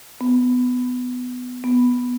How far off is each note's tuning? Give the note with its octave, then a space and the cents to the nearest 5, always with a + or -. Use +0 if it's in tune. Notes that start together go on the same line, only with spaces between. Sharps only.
B3 +15
B3 +0